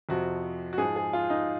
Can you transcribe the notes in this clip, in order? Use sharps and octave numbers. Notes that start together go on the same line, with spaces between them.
F2 C3 F3 F#4
F#4
G#2 F3 G#4
G#4
F4
D#4